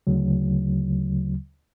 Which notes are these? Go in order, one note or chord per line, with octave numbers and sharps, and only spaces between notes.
D2 C#3 F#3